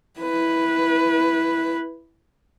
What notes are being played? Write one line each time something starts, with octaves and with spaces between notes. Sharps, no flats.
E4 B4